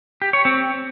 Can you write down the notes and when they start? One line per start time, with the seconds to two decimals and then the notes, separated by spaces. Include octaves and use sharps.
0.22 G4
0.33 C#5
0.45 C4